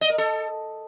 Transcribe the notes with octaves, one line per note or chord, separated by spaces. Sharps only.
D#5
A#4
A4